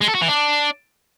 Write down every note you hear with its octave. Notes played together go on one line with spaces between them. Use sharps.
G#3
A4
F#4
E3
D4